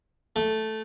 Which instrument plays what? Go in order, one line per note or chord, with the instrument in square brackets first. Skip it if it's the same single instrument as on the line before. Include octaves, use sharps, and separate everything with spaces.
[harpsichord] A3